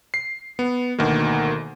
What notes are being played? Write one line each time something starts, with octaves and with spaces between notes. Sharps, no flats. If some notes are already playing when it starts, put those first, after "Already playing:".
C7
B3
D2 B2 D#3 A#3